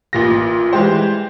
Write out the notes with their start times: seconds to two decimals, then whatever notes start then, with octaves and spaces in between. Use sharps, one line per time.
0.13 A1 A#2 A#6
0.73 E3 G3 G#3 G4 C5